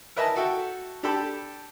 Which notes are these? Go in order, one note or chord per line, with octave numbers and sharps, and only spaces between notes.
A#4 B4 D#5 E5 G#5 A5
F#4 A4 E5 G5
D4 G4 A4 G5 B5